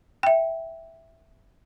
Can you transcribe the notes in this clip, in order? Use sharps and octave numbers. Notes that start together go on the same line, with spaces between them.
E5 G5